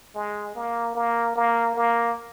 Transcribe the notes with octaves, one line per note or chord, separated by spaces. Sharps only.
G#3
A#3
A#3
A#3
A#3